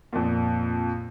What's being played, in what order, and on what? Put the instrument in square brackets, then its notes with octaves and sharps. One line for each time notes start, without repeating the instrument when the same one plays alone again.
[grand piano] F2 A#2